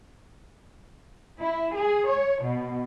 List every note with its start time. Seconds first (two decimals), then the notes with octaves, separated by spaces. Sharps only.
1.41 E4
1.75 G#4
2.11 C#5
2.43 B2